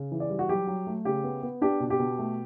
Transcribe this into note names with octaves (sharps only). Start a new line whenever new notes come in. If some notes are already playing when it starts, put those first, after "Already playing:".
Already playing: C#3
E3
D5
G3
F#4
F#3 G4
F#3
A3
C#3 G4
B3
B3
D4 G4
B2
G4
B2
A3